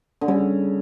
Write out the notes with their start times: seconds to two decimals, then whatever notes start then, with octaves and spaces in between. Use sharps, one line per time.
0.21 D3
0.28 C#3 G3